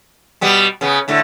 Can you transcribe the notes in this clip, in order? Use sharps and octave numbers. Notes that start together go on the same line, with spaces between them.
B2 G3 B3
C#3 B3
A2 D3 A3